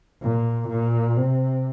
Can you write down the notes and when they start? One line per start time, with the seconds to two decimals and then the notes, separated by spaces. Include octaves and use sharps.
0.21 A#2
0.69 A#2
1.16 C3